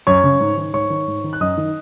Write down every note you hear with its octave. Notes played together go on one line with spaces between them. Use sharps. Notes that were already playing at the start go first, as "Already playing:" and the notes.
F#2 C#5 C#6
C#3
G#2
D#3
G#2 C#5 C#6
D#3
G#2
D#3
F#6
F#2 D#5 D#6
D#3